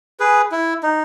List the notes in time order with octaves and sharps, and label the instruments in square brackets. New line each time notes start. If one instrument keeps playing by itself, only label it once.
[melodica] G#4 B4
E4
D#4